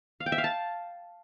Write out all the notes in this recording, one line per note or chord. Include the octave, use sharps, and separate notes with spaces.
F5
G5
E5
F5
A5